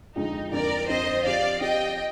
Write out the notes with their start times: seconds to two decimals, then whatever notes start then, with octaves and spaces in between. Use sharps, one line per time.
0.15 F2 D3 F3 G#3 D#4
0.51 F2 D3 F3 C4 A#4 D5
0.88 F2 D3 F3 C4 C5 D#5
1.24 F3 C4 G4 D5 F5
1.61 F3 C4 G4 D#5 G5